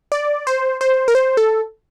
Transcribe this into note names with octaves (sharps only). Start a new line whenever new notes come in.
D5
C5
C5
A#4
C5
A4